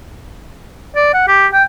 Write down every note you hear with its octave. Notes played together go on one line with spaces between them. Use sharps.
D5
F#5
G4
G5